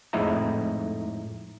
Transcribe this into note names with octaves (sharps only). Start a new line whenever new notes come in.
F2 A2 G#3 D#4 E4 A#5